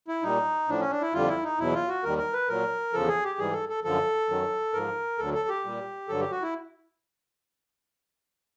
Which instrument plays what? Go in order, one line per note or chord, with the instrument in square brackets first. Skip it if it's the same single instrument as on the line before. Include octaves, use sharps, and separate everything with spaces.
[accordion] E4
A#2 G3 D#4
A2 F3 D4
C#4
D4
E4
F2 D3 G3 F4
E4
D#4
E2 B2 F#3 E4
F4
F#4
D#2 D#3 G3 A#4
A#4
B4
A#2 F#3 A#4
E2 C#3 F3 A4
G#4
G4
G#2 E3 G3 G#4
A4
A4
F#2 D3 F3 A4
F#2 D#3 F#3
G#2 F3 A#4
D2 D3 F#3 A4
A4
G4
A#2 G3
G2 D3 F#3 A4
G4
F#4
E4